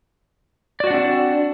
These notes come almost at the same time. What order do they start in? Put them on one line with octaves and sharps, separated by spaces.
D5 F#4 F#5 D4 C4